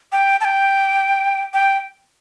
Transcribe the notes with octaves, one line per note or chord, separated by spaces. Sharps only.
G5
A5
G5
G5